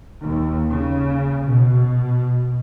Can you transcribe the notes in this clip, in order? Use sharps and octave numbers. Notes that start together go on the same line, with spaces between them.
D#2
C#3
B2